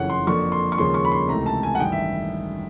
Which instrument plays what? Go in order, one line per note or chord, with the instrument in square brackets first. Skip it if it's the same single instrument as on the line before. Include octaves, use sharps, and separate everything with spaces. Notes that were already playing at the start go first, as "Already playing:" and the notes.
Already playing: [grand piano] F#1 F2 C#3 E3 C#5 F#5
C6
F2 D3 F3 A#3 D4 C#6
C6
C#6
D#2 C#3 F3 G#3 C#4 C6
C#6
B5
C6
C#2 C3 E3 A3 A#5
A5
G#5
F#5
A1 G2 D#3 G5
E5